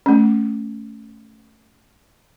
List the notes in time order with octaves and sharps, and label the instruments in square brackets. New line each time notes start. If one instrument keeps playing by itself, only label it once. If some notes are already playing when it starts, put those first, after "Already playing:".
[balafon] A3 C#4